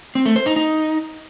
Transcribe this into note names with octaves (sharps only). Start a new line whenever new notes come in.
C4
A3
C5
D#4
D#4